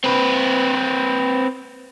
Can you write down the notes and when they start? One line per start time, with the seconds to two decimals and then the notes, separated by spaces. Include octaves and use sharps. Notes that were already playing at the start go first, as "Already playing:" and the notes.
0.04 C4 B4